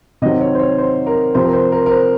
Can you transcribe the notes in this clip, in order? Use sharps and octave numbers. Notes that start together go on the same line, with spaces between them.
C3 D#3 F#3 C4 D#5
C#5
C5
C#5
C5
A#4
C3 F3 C4 C5
A#4
C5
A#4
A#4
C5